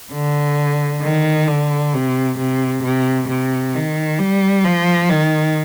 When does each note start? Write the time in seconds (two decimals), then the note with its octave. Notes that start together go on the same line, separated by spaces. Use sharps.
0.13 D3
1.02 D#3
1.48 D3
1.94 C3
2.38 C3
2.83 C3
3.29 C3
3.75 D#3
4.19 G3
4.65 F3
5.10 D#3